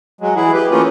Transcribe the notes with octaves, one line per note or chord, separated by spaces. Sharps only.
F#3 G#3
E3 E4 G#4
G4 B4
E3 A3 A#3 C#4 F4